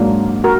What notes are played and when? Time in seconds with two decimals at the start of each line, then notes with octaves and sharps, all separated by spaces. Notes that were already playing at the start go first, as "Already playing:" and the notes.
Already playing: G#2 F#3 A#3 D4
0.44 F#4 A#4